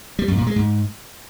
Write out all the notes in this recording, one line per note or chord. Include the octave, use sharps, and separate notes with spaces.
G3
F#2
A#2
G#3
G#2